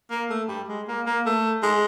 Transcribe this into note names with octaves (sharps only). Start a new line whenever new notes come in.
A#3
A3
G3
G#3
A#3
A#3
A3
G#3